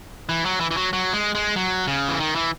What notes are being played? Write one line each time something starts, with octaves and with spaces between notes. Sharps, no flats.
E3
F#3
E3
E3
F#3
F#3
G#3
G#3
F#3
C#3
E3
D#3
E3